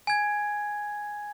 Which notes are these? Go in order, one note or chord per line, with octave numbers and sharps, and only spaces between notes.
G#5 G#6